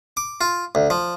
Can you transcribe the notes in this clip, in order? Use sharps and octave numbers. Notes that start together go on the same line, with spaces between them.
D6
F4
D2
F3